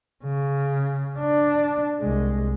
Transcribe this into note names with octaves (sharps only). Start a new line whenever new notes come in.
C#3
D4
C2 G#3